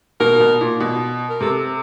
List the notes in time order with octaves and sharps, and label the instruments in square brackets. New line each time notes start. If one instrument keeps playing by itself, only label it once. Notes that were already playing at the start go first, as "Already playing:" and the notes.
[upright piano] B2 [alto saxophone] A#4
[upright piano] B2
A#2
B2
[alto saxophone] A#4
[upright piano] C3 [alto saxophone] A4